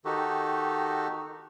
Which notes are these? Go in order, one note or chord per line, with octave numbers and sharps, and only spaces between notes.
D#3 D#4 F#4 G4 A4